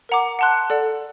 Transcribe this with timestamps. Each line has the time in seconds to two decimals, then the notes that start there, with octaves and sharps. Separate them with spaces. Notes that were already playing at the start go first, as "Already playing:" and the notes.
0.09 A#4 F#5 A#5 D6
0.39 F#5 A5 C6 F#6
0.70 A4 D5 F#5